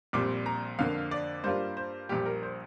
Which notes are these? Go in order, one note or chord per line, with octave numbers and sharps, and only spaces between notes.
A#1 A#2 G3 C4 D6
A#5
F2 D3 A#3 F5
D5
G2 G3 A#3 D4 F4 C5
C5
A#1 A#2 G3 G4
A#4
C5